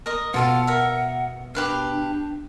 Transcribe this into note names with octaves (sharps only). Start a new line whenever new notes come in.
A#4 D#5
B2 B3 F4 A4 F5 F#5
A#4 E5
D4 G4 B4 F5